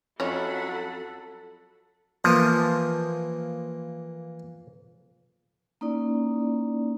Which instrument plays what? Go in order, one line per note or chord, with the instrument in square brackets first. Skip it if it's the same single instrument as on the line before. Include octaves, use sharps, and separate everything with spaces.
[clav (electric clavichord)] F2 [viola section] F#3 F#5 B5 [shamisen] C#4 E4 C#5 [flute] A4
[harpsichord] E3 A#3 [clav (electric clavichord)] F3
[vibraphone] A#3 C#4 D#4 E4 D5